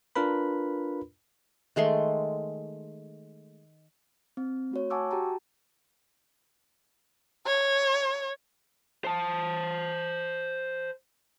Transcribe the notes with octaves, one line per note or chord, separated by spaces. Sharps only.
D4 F4 A#4 B4 B5
D#3 G#3 A3 C6
C4
A3 F#4 C#5
F#5 G#5 A5 C#6 D6 E6
F#4 G4 G5 A5 A#5
C#5
C5 A5